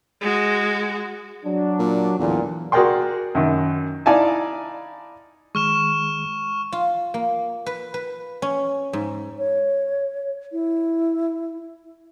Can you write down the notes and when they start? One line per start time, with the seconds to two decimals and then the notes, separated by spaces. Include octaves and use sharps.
0.21 G#3 F#4
1.45 F#3 D4
1.79 A#2
2.19 A1 E2 A#2 D3
2.72 F#4 G#4 A#4 D5 G5 C6
3.35 F#2 D#3
4.06 D#4 E4 D5 F5 G#5 A5
5.55 D#3 G#3 C#6 F6 E7
6.73 F4
7.14 A#3
7.66 B4
7.94 B4
8.42 C#4
8.93 G#2
9.38 C#5
10.52 E4